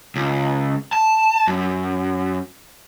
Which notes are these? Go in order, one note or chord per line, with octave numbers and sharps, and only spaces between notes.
C#2
A5
F#2